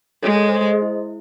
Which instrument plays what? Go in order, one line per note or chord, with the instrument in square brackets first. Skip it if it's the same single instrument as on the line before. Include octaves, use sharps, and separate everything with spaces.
[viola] G#3 [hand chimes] A4 C#5
[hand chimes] A4 C#5
G#4 C5
C5 D#5
E4